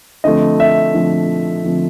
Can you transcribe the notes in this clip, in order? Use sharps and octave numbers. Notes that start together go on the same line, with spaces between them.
D3 F3 A3 C4 D#5
E5
D3 F3 A3 C4
D3 F3 A3 C4